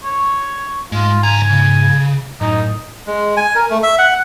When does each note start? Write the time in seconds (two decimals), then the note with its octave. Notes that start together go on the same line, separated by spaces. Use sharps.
0.03 C#5
0.92 G#2 G#3 F4
1.23 C#2 G#5 A#5
1.49 C#3
2.41 F#2 A2 D#4
3.07 G#3
3.37 G#5
3.55 A#4
3.70 A3
3.83 E5
3.98 F#5